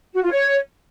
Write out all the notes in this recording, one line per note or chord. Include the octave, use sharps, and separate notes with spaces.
F#4
F4
C#5